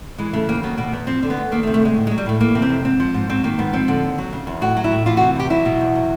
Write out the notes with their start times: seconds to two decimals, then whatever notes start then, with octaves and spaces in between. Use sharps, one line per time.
0.18 E3 G#3
0.33 C#3 A3
0.49 D#2 A#3
0.63 F#3 B3
0.77 B2 A#3
0.92 E2 B3
1.07 F3 C4
1.22 D3
1.30 B3
1.37 D2
1.52 D#3 A#3
1.63 A3
1.67 C3
1.74 A3
1.82 D2 G#3
1.96 A2
2.07 F#3 G#3
2.18 G3
2.26 A2 A3
2.41 E3 A#3
2.55 C3
2.62 C4
2.69 F2
2.85 G#2 C4
3.00 F3
3.14 G#2
3.30 F#3 C4
3.44 D#3 A#3
3.58 G#2 B3
3.73 F3 C4
3.88 D3
4.03 D#2
4.18 F#3
4.33 C#3
4.47 E2
4.61 A2 F#4
4.77 F#3
4.84 E4
4.91 A2
5.06 E3 F4
5.17 C3 F#4
5.36 E2 G4
5.50 F#3 E4
5.65 B2
5.81 E2
5.95 F#3